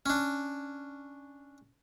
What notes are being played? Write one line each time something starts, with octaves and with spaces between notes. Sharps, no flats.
C#4 D4